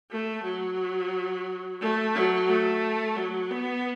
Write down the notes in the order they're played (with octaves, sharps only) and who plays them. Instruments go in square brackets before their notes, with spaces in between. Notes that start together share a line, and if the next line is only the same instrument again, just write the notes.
[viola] A3
F#3
A3
F#3
A3
F#3
B3